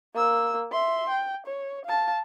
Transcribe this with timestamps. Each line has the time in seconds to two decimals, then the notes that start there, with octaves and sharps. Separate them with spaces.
0.14 A#3 E6
0.72 E5 C6
1.09 G5
1.46 C#5
1.85 F5 A5